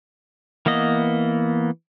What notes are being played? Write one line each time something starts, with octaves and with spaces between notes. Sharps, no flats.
E3 A#3 B3 D#5